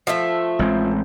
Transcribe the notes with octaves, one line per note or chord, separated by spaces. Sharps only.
F3 A3 E5
A1 G#3 C4